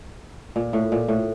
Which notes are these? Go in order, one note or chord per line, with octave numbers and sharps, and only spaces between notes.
A#2
A2
A#2
A2